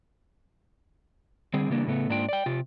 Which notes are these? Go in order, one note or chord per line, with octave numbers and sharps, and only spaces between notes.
D3 G3 C4 G#4
C#3 E3 G3 A#3 D4
A2 C#3 A3 B3
G#2 A#3 D4 F4 G5
D5 G5
C3 F4 G4